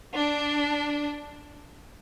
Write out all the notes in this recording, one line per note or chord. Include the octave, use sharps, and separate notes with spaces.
D4